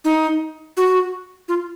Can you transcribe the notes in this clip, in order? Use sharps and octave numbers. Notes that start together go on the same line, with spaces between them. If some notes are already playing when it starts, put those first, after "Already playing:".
D#4
F#4
F4